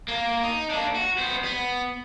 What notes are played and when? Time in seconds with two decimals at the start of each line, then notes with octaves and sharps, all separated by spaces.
0.08 A#3
0.44 D#4
0.70 A#3 D4
0.96 F#4
1.18 B3 C5
1.44 B3